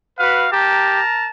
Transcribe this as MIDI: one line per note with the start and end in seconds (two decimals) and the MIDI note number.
0.19 0.46 66
0.19 0.46 71
0.19 0.48 77
0.52 1.01 67
0.52 1.31 70
0.52 1.31 81
0.52 1.31 82